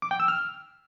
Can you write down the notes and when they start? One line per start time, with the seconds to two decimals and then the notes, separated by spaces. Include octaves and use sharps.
0.02 D6
0.11 G5
0.20 E6
0.28 F6